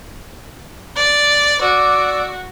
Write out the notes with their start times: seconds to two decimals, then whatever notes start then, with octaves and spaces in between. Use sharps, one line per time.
0.96 D5
1.61 F#4 D5 D6 E6